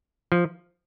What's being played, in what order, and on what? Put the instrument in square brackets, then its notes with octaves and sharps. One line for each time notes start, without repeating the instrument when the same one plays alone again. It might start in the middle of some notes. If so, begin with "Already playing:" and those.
[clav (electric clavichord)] F3